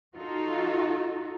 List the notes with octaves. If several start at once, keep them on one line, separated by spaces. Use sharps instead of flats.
D#4 F4 F#4 A4